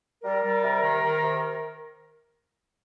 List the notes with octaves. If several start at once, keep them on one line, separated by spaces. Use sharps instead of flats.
G3 A#4
G3
C3
D#3
D#3
C3